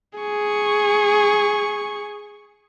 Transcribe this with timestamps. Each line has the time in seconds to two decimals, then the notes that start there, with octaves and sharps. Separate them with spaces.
0.19 G#4 C#6